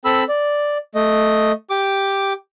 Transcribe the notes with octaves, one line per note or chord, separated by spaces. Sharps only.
C4 A4 B5 E6
D5
A3 D#5
G4 D6